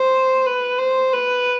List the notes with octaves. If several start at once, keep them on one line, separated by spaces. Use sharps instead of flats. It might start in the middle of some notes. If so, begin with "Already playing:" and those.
Already playing: C5
B4
C5
B4